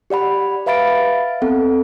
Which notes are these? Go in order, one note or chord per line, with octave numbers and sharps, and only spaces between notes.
G4 D5 F#5 B5
B4 E5 F5 B5 A6 D7
B3 C4 A4 F#5